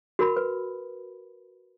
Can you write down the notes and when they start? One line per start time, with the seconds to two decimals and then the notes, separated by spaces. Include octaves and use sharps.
0.19 F#4 A#4 B5
0.37 B4